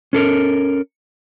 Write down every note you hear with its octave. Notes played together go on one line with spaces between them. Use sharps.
C#4 A4 A#4